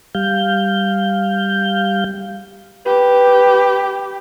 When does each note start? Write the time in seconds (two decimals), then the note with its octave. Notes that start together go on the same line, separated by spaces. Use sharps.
0.15 G3 F5 G6
2.86 G4 B4